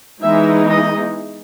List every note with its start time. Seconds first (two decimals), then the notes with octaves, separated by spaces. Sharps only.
0.22 E3 G#3 B3 D#4 E5
0.70 D#5